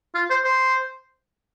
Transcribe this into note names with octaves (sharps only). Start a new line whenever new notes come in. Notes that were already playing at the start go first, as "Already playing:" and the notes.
F4
C5
C5